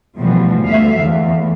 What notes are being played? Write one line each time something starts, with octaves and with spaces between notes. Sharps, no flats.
B2 D3 E3 F3 G3 A3
D2 D3 E5 F5
E2 A3